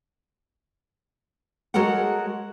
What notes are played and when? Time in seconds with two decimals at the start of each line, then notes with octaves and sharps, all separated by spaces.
1.74 G#3 F#4 A4 A#4 C#5 F#5